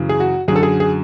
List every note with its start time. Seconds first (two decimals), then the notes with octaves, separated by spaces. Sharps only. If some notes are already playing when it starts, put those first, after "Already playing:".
Already playing: F#2 C#3 E3
0.09 G#4
0.20 F#4
0.48 F#2 G#4
0.52 D3 A4
0.63 G#4
0.80 G#4